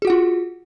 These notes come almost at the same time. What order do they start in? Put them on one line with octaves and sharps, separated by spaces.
G#4 F#4 F#5 F4